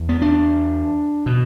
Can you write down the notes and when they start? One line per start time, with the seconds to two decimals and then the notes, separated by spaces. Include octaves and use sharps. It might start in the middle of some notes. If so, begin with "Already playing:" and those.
Already playing: E2
0.09 B3
0.22 D4
1.26 B2